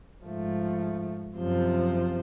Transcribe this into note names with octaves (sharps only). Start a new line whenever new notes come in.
G#2 F3 A3
F#2 C3 F3 C5